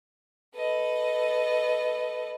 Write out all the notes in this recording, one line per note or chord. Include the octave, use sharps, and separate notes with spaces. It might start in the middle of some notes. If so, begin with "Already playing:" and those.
A4 B4 D#5